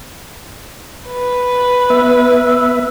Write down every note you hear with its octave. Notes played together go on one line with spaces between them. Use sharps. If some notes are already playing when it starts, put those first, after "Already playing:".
B4
B3 E5